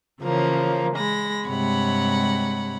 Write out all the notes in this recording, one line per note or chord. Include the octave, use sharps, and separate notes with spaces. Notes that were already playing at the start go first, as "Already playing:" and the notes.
C#3 E3 F3 A#3 C#4
G#3 B5 A#6
G2 C3 G#3 C#5 F#5 B5